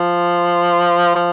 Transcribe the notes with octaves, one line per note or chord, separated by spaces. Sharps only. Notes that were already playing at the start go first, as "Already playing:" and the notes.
Already playing: F3
F3